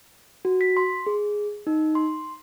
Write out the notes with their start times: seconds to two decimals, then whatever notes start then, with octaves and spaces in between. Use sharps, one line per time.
0.45 F#4
0.61 B6
0.77 C6
1.06 G#4
1.67 D#4
1.95 C6